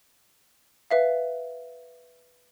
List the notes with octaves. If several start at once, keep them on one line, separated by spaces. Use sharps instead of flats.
B4 E5 F5